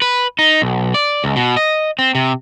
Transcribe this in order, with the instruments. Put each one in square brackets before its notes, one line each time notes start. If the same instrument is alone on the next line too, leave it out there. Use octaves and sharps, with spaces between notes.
[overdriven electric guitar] B4
D#4
B1
D5
C#2
B2
D#5
C4
C3